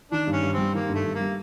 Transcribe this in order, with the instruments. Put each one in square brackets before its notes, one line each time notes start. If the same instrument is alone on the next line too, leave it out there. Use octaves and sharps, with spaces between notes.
[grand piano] D#3 [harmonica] D4
[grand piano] G2
[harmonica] C#4
[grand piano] G2
[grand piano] G3 [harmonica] C4
[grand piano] D#3 [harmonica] A#3
[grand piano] G2
[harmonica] A3
[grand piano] G2
[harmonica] A#3
[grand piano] G3